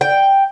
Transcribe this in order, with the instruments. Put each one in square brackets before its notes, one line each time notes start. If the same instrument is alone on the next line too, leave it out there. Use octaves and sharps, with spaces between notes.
[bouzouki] G5